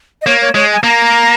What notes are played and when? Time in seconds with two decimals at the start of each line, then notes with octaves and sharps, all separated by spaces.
0.22 D#5
0.27 A#3 C#5
0.41 C#5
0.55 G#3 C#5
0.72 G#5
0.83 A#3 A#5